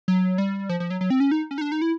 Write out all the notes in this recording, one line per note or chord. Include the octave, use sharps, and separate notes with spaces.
F#3
G3
F3
F3
F#3
F#3
C4
C#4
D#4
C#4
D#4
D4
D#4
E4